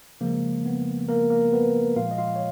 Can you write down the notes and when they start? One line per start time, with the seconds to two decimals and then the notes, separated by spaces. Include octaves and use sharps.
0.21 C#3 F3 G#3 A#3
0.66 B3
1.09 A#3 A#4
1.30 A#3 A#4
1.52 B3 B4
1.96 A#2 F3 G#3 F4 F5
2.11 D#5
2.18 F4 F5
2.36 C#5